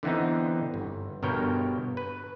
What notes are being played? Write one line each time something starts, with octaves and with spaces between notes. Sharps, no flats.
D3 E3 B3 C4 D#4
G1
G1 G2 B2 A#4 C#5 G5
B4